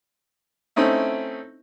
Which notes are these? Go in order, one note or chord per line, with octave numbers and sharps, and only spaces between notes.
A3 C4 C#4 D#4 E4